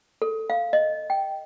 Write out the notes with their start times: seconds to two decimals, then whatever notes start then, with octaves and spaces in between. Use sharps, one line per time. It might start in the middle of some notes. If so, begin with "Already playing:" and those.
0.22 A4
0.50 F5
0.73 D#5
1.10 G5